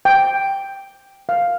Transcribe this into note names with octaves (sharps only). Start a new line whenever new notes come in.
G5
F5